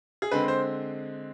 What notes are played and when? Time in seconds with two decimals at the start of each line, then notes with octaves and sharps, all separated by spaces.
0.22 G#4
0.31 D3 G#3 C4 B4
0.48 C5